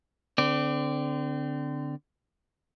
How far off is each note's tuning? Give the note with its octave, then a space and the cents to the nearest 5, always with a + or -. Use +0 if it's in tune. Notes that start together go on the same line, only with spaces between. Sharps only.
D3 +0 C4 -30 D5 +0